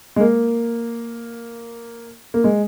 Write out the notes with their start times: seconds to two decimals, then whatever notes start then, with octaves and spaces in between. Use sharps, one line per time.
0.16 G#3
0.20 A#3
2.34 A#3
2.44 G#3